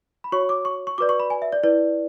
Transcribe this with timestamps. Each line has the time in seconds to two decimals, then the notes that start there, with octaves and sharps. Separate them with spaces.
0.24 B5
0.32 F#4 C#5 C#6
0.49 D6
0.65 C#6
0.87 C#6
0.98 F#4 B4 D5 D6
1.09 C#6
1.20 B5
1.30 G#5
1.42 E5
1.52 D5
1.63 E4 B4 D5